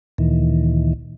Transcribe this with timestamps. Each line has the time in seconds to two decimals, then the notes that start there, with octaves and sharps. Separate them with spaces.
0.18 D2 A#2 D#3 E3